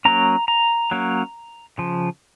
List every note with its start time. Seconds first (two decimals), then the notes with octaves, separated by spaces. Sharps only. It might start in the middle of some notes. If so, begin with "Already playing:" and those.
0.05 F#3 A#3 C#4 A#5
0.48 A#5
0.91 F#3 A#3 C#4
1.78 C#3 F3